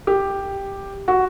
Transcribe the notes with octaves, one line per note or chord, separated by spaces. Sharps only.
G4
F#4